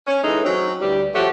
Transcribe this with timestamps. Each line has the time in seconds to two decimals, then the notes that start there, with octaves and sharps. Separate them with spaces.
0.07 C#4
0.24 E3 G#3 A3 D#4
0.44 F#3 C4 C#4 D#4
0.81 D2 E3 G3 G4 D5
1.14 F3 A3 F#4 G4 C#5